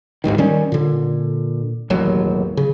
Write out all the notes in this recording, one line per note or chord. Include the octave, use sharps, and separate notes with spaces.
G#1 D#2 G#2 D#3
D#3 G3 C#4
A#2 D3
E1 A1 D#2 F#3
C#3